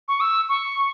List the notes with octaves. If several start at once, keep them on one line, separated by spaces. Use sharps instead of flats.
C#6
E6
C#6